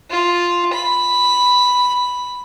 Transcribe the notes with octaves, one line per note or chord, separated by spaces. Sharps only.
F4
B5